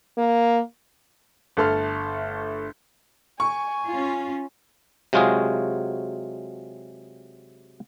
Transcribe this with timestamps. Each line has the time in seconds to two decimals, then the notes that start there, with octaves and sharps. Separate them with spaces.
0.18 A#3
1.57 G1 A3 A4 C6 F6
3.40 G#5 C#6
3.90 C#4 F4
5.13 C3 F#3 G#3 F4 F#4 G#4